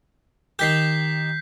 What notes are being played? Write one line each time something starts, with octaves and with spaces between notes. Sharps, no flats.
D#3 G4 G6 B6 C7